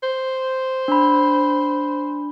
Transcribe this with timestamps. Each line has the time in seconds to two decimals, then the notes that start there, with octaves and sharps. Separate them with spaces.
0.03 C5
0.88 D4 B5